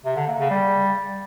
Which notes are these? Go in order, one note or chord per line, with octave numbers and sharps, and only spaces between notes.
C3
D3
A#3
C#3
G3